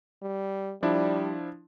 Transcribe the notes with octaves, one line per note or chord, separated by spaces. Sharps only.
G3
F3 G3 D4 E4